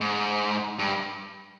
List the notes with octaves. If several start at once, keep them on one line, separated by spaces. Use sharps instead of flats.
G#2
G2